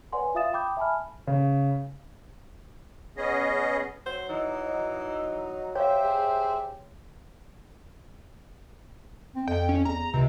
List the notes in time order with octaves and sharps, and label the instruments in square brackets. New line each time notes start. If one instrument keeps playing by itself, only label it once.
[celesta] B4 C#5 D5 F#5 G#5 C6
F4 E5 F5 D#6 A6 E7
G5 B5 D6 D#6 G6
E5 G#5 A5 B5 F6
[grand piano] C#3
[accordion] B3 C#4 G#4 D#5
[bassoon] F#3 [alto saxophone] C5
[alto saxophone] E3 [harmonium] D#4
[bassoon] F#3
[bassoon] G4 [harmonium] C5 E5 [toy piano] C#5 F5
[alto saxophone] G#4
[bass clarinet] C4
[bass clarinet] F2 [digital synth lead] G5
[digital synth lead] C#4
[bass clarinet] E2 [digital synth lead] A#5
[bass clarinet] C#2 [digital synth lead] C3